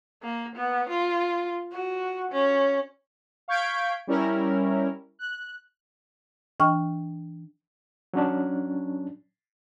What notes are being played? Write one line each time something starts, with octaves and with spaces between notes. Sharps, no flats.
A#3
B3
F4
F#4
C#4
F5 C#6 G6 G#6 B6 D7
G3 C#4 E4 A#4
F#6
E3 D4 D#5 G5 C#6 F6
F#3 C#4 D4